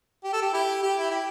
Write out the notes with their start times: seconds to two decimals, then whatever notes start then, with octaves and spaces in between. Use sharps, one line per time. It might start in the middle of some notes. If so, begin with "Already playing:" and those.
0.24 G4
0.33 A4
0.42 G4
0.54 E4 G4
0.83 G4
0.97 E4
1.11 E4 G4